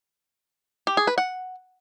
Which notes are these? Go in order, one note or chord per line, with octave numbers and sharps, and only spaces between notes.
G4
G#4
B4
F#5